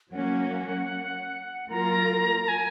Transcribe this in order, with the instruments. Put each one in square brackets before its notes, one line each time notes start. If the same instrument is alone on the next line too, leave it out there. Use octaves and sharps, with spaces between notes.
[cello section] F#3 A#3 C#4 [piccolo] F#5
[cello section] F#3 A#3 F4 A#4 [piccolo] A#5
[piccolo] A#5
G#5